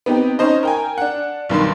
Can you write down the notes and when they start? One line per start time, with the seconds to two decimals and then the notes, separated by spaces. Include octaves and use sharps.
0.06 B3 C4 D#4 G4
0.39 C#4 D#4 C5 D#5
0.63 A#4 G5 G#5
0.98 D4 F#5
1.49 B1 G2 D#3 C6